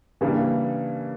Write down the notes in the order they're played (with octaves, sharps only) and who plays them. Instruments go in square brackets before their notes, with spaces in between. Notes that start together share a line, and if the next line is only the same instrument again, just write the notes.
[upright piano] C#3 E3 G3 A#3 D4